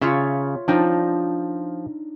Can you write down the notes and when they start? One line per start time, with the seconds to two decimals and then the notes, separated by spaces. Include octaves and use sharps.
0.02 C#3 F4 C#5 E5
0.68 F3 D4 D#4 G5